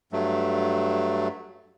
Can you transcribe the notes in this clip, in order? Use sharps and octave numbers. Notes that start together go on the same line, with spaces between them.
G2 F#3 A3